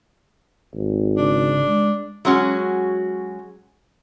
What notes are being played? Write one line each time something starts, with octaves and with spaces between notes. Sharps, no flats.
G#1
C#3 D4
G#3
F#3 G#3 C#4 F#4